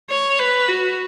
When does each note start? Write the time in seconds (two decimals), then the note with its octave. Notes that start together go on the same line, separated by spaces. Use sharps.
0.10 C#5
0.39 B4
0.69 F#4